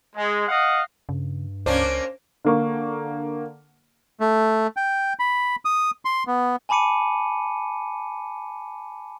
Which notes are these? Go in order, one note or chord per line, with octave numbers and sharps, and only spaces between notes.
G#3
D#5 F5 F#5
G2 C#3
C#2 A#3 C#4 D4 C5
D3 A#3 C#6
A3
G5
B5
D#6
C6
B3
G#5 A5 B5 D6 C#7 D#7